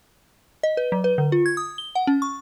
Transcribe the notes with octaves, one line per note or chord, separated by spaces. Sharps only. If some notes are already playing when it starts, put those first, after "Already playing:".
D#5
B4
F#3
B4
D3
F4
G#6
D#6
G7
F#5
C#4
C#6